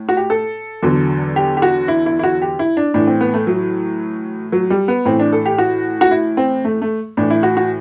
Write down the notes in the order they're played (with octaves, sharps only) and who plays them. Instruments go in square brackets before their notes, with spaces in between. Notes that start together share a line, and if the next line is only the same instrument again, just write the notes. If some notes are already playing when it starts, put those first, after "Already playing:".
Already playing: [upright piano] A2
F#4
G4
A4
E2 D3 F#3
G4
G4
F#4
E4
E4
E4
F#4
G4
E4
D4
A2 E3 D4
C4
B3
A3
F#3
F#3
G3
B3
A2 E3 C4
D4
A4
G4
F#4
F#4
E4
C4
A3
A3
A2 E3 D4
E4
F#4
F#4